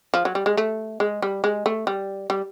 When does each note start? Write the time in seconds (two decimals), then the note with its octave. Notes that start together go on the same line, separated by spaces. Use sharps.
0.14 F3
0.25 F#3
0.35 G3
0.46 G#3
0.57 A3
1.00 G#3
1.22 G3
1.44 G#3
1.66 A3
1.87 G3
2.30 G3